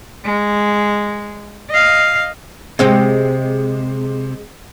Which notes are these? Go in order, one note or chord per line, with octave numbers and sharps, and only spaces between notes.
G#3
D#5 F5
C3 G#3 C4 G4